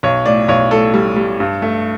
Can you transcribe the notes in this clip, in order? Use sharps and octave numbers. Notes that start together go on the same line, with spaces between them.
B1 C#5
A2 D5
B1 C#5
A2 A4
G3
G3
G2
A3